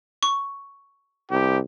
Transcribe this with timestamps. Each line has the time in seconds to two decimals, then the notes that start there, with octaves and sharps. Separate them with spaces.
0.23 C#6
1.31 C2 G4